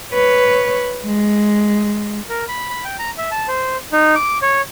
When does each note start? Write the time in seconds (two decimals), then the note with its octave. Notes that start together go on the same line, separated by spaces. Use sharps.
0.13 B4 C#5
1.05 G#3
2.30 A#4
2.48 B5
2.70 B5
2.85 G5
2.99 A#5
3.18 E5
3.31 A5
3.48 C5
3.93 D#4
4.15 D6
4.42 C#5